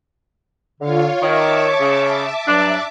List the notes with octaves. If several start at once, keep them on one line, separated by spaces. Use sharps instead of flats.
D3 F4 C#5 F5
D#3 C#5 E5 A5 D6
C#3
G2 F#3 D4